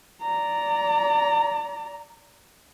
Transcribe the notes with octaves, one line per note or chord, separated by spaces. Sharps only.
D5 A#5